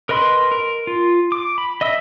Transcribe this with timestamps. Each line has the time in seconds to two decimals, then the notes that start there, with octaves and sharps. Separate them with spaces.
0.09 A#4 B4 D#5 B5 C6
0.52 A#4
0.87 F4
1.32 D6
1.58 B5
1.81 D#5 E5 E6